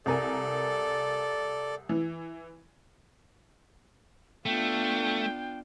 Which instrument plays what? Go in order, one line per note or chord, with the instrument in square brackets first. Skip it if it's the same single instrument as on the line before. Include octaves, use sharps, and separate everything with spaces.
[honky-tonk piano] C2 A#4 G#5 [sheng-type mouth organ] A4 D5
[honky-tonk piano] E3
[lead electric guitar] A3 [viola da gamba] B3 D4 F4 [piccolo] G5